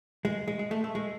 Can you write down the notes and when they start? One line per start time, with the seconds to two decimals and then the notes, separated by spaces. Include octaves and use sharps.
0.25 G#3
0.48 G#3
0.59 G#3
0.71 A3
0.84 A3
0.95 G#3